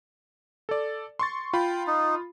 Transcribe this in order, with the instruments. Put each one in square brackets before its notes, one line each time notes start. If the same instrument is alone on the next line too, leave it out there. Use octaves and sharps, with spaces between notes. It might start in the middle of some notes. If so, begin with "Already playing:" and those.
[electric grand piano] A4 D5
C6 C#6 A6
[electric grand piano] F4 B5 [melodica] G5
[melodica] D#4